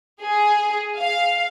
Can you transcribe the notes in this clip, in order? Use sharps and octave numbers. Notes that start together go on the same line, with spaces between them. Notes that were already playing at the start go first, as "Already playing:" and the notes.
G#4
F5